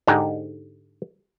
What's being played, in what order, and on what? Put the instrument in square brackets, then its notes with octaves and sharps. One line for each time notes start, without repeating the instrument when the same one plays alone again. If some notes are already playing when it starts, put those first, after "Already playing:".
[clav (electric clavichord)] G#2 D3 G#3 D#4 G4